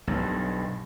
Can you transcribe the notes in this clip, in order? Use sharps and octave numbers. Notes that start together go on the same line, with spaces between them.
B1 G2